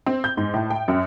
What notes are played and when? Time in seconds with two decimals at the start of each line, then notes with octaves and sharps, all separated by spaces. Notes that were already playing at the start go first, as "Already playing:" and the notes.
0.06 C4
0.24 G6
0.37 G#2
0.54 A2
0.70 G5
0.88 F#2